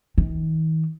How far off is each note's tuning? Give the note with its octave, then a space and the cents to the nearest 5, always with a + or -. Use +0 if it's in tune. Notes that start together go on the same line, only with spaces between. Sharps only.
D#3 +45